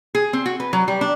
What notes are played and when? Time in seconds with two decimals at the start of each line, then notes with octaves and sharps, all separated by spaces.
0.15 G#4
0.33 C4
0.46 F#4
0.60 B4
0.73 F#3
0.88 G3
1.01 D4